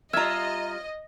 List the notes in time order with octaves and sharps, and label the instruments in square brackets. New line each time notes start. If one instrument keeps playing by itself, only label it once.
[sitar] G3 F4 [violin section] D#5 [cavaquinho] E5 A#5 [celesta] F6 G#6